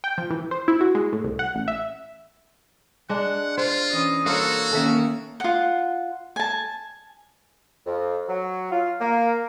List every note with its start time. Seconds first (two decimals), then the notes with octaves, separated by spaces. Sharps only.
0.04 G5
0.18 F3
0.30 E3
0.51 C5
0.68 E4
0.81 F#4
0.95 G#3
1.13 A2
1.24 C2
1.39 F#5
1.55 A1
1.68 E5
3.09 G#3 D4 F#5
3.57 F4 C5
3.90 E3 C#4 D#5
4.26 A#3 F#4 A4 C5 C#5 F5
4.72 D#3 A#3 C#4 A4 E5
5.40 F4 F#5
6.36 G#5 A5
7.86 F2
8.28 F#3
8.72 F4
9.00 A#3